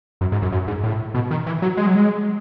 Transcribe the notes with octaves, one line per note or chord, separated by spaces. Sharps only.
F#2
G#2
F#2
F#2
G#2
A2
B2
D#3
E3
F#3
G#3
F#3
G#3